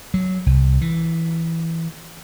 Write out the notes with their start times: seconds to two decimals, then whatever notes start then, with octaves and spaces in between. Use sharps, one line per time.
0.14 F#3
0.46 C2
0.81 E3